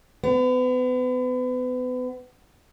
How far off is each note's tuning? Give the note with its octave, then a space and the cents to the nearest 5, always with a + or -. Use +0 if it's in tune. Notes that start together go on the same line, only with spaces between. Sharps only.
B3 +35